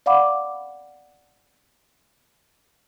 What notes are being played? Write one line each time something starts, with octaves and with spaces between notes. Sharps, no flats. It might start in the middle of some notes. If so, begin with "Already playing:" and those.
D5 F5 F#5 B5 D6